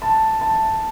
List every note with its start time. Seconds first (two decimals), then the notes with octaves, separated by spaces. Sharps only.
0.02 A5
0.41 A5